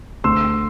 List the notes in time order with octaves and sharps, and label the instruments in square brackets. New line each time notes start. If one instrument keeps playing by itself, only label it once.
[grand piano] D2 C6 E6